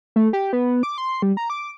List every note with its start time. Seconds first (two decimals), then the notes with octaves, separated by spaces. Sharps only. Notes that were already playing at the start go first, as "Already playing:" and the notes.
0.16 A3
0.33 G4
0.53 B3
0.83 D6
0.98 C6
1.22 G3
1.37 A#5
1.50 D6